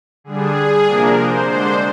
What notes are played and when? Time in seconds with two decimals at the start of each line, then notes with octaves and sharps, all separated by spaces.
0.24 D3 G3 D4 G#4
0.85 C3 F3 A#3 D4 A#4
1.15 C5
1.46 D3 G#3 D4 C5